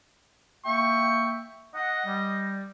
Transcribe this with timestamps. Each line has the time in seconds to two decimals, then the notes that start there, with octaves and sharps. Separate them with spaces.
0.65 A#3 E5 G5 C#6
1.75 D#5 F#5
2.06 G3